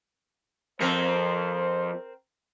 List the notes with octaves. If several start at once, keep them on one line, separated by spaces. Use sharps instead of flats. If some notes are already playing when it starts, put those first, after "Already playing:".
F2 C4 A#4 C5